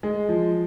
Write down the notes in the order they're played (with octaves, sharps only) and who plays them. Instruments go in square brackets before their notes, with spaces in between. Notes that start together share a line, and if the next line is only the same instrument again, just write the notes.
[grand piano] G#3
F3